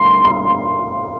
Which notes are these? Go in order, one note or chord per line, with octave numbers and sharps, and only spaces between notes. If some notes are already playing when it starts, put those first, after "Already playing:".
Already playing: C6
C6